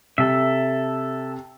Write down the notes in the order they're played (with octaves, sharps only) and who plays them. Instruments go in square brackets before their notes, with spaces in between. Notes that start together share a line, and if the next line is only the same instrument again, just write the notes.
[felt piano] C3 [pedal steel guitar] A4 E5